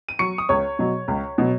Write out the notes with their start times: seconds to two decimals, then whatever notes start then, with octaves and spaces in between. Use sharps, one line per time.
0.08 D#7
0.19 F#3 C#6 C#7
0.38 D#6
0.49 C#2 C#5 C#6
0.79 B2 F#3
1.08 C#2
1.38 B2 F#3